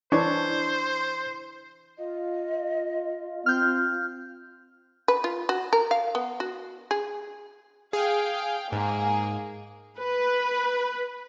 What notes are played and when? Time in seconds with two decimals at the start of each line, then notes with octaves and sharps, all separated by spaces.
0.12 E3 D4 C5 C#5
1.98 F4 D#5
3.46 C4 F6 G6
5.08 B4
5.24 F4
5.49 F#4
5.73 A#4
5.91 F5
6.15 B3
6.40 F#4
6.91 G#4
7.93 G#4 F5 G5
8.72 G#2 A#3 G#4
9.99 B4